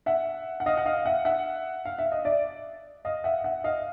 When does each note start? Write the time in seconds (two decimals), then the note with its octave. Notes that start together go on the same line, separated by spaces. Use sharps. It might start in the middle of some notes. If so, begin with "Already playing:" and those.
0.06 E5 F#5
0.60 F#5
0.66 D#5 F5
0.77 F#5
0.86 D#5 F5
1.05 E5 F#5
1.25 E5 F#5
1.85 F5
1.99 E5
2.12 D#5
2.25 D5 E5
3.05 D#5 F5
3.24 E5 F#5
3.44 E5 F#5
3.64 D#5 F5